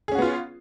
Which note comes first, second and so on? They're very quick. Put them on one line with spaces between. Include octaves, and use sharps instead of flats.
G#4 C#4 F#4 B3 F4